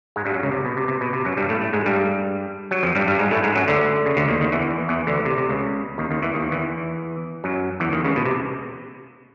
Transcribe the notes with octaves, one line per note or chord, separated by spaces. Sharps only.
G#2 G#3
G2 G3
F#2 F#3
C#2 C#3
C3
B2
C3
C3
B2
C3
F#2 F#3
G2 G3
A2 A3
A2 A3
G#2 G#3
G2 G3
F#3
F2 F3
G2 G3
G2 G3
G#2 G#3
A2 A3
G#2 G#3
F#2 F#3
D2 D3
C#3
D2 D3
D#2 D#3
D#2 D#3
E2 E3
E2 E3
D2 D3
C3
C3
C#2 C#3
D#2 D#3
D#2 D#3
E2 E3
D#2 D#3
E2 E3
F#2 F#3
E2 E3
D#2 D#3
C#2 C#3
B2
C3